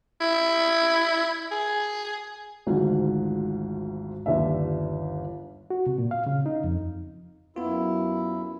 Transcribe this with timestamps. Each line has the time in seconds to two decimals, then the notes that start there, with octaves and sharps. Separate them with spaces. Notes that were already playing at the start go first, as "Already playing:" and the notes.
0.21 E4
1.51 G#4
2.67 G#1 D2 G#2 F3
4.26 G1 D#2 D4 E5
5.70 F#4
5.87 C3
5.98 A#2
6.11 F5
6.27 C#3
6.46 D#4
6.64 F2
7.56 F#2 B3 E4 F4